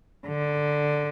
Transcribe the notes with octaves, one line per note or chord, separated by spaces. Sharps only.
D3